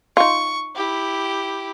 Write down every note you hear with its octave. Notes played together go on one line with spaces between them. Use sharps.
D#4 F4 C#6
E4 G4